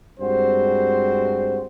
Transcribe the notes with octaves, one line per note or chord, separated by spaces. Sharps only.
G2 G#3 C4 F#4 C5